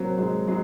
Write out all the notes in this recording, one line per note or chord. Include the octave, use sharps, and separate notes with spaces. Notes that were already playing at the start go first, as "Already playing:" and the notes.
Already playing: F#3 A#3 C4
F#3 G#3
F#3 G#3